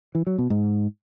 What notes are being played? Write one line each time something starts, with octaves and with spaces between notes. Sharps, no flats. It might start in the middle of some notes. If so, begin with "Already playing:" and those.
E3
F#3
B2
G#2